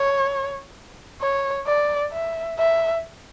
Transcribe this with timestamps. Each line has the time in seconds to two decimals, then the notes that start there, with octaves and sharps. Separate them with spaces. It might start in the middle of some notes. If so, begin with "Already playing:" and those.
Already playing: C#5
1.21 C#5
1.67 D5
2.12 E5
2.59 E5